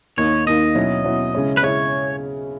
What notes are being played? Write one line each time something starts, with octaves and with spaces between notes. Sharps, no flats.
D#2 D#3 A#3 D#4 C#5
D#2 D#3 A#3 D#4 D#5
B2 F#3 C#4 E4
B2 F#3 C#4 E4
C#3 G#3 C#4 E4
B4
C#3 G#3 C#4 E4 C#5